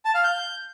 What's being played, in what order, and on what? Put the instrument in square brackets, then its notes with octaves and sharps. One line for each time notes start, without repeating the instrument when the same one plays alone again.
[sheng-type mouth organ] A5
F5
G6